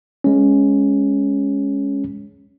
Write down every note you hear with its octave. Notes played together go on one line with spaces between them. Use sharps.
G#3 C#4